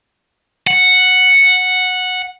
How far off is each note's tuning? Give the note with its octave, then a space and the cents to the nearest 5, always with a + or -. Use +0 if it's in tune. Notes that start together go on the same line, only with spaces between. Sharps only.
F#5 -5